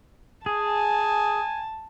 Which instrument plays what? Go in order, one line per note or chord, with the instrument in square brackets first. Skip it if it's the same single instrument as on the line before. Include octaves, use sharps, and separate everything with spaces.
[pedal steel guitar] G#4 [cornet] G#5 [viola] A5